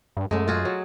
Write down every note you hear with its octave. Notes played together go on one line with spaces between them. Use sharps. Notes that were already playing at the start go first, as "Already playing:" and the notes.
G2
F#2 G#3 A3
F4 F#4 G#4
F#3